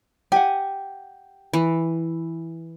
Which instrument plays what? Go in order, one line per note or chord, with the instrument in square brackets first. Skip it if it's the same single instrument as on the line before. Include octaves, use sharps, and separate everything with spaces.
[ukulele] G4 F#5 [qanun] G#5
[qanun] E3